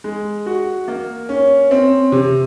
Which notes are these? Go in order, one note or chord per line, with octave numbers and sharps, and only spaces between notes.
G#3
F#4
A#3
C#4
C4
C3